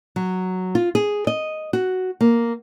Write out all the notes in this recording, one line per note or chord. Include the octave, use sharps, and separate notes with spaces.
F#3
F4
G#4
D#5
F#4
A#3